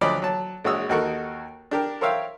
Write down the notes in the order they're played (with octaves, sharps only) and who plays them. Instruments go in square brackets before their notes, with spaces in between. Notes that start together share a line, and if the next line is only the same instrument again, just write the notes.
[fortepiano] D2 F3 F#3 D5 D#5 B5
F#3 A5
A#1 G#3 F#4 C#5 D#6 E6
D#2 D#4 F#4 A4 A#4 C#6
D4 G4 A#4
A#4 C5 C#5 E5 F5 G5